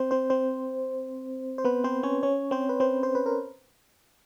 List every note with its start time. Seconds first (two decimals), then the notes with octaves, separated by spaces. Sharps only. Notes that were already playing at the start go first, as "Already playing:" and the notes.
Already playing: C4 C5
0.11 C4 C5
0.30 C4 C5
1.58 C5
1.65 B3 B4
1.84 C4 C5
2.03 C#4 C#5
2.23 C#4 C#5
2.51 C4 C5
2.69 B4
2.80 C4 C5
3.03 C5
3.15 B4
3.26 A#4